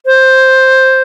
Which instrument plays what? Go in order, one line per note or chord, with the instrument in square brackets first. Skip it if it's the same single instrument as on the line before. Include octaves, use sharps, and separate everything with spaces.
[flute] C5